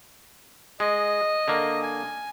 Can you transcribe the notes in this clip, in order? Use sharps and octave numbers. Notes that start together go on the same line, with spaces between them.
G#3 D#5
D3 A#3
G#5